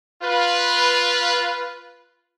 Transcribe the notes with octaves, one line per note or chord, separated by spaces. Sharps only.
F4 B4